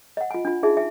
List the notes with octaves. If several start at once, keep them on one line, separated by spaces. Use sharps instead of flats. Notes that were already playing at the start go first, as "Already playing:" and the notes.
D#5 F#5
F4 G#5
D4 F4
D#4 F4 G#4 E5 G#5
E5 G#5